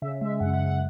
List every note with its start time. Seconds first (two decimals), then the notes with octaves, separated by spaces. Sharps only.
0.02 C#3 E5
0.21 G#3 E5
0.40 F#2 F#5
0.53 F#5
0.60 F#2
0.66 F#5